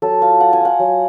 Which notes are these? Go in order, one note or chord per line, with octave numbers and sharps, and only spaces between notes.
F#3 A4
F4 F5
F4 F#5
G#5
F4 F#5
F#3